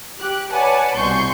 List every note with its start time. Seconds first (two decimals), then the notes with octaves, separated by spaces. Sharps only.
0.19 G4 F#6
0.52 B4 C#5 D5 F#5 G#5 A5
0.96 C2 B2 C6 C#6 G6